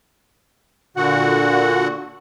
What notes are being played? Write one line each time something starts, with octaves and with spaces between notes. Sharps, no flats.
A#2 D3 F#4 F#5